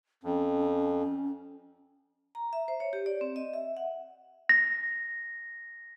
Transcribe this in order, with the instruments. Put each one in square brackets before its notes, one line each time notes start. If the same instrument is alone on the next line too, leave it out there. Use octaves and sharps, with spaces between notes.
[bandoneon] F2 [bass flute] C#4
[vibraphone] A#5
E5
C5
C#5
G4
D5
C4
D#5
E5
F#5
[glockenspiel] A#6